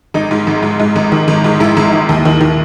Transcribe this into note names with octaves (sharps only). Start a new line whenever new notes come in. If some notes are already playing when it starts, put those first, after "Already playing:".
G#1 D#4
G#2
G#1
G#2
G#2
G#1
D#3
G#1
G#2
G#1 E4
G#1
D#3
D#2
D#3
D#3